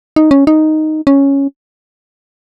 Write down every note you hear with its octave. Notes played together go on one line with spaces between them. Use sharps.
D#4
C#4
D#4
C#4